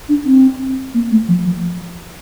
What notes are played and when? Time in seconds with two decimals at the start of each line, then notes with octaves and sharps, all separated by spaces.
0.09 D4
0.25 C4
0.94 A#3
1.11 A3
1.28 F3
1.45 F3